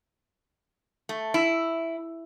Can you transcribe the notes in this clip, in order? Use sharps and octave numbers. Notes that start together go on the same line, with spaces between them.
A3
E4